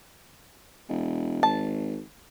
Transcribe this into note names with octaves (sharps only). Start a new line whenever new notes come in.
E1
G#1 A5